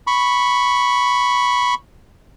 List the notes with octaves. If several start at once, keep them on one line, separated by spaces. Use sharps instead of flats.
B5 C#6